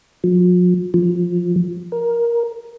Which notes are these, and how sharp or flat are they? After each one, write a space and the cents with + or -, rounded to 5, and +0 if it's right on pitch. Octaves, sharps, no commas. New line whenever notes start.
F3 +45
F3 +5
A#4 +10